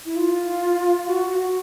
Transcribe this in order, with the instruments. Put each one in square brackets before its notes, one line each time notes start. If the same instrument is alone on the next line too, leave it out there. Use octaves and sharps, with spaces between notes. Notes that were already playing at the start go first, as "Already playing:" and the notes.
[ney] E4
F4
F#4
F#4